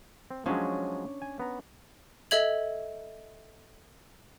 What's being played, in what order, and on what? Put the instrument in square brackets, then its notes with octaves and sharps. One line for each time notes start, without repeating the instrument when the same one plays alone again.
[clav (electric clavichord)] C4
[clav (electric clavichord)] F3 F#3 G#3 [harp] C#4 D4
[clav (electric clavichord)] G#5
B3 A#5
[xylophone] A4 D#5 E5 G#6 F#7